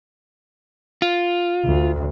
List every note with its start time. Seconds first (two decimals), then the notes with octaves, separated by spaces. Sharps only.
1.02 F4
1.65 D2